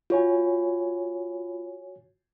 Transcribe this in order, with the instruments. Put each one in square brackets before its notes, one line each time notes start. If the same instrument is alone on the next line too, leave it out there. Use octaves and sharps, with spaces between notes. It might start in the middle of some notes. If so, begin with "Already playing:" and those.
[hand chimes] F4 [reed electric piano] F#4 C#5 G#5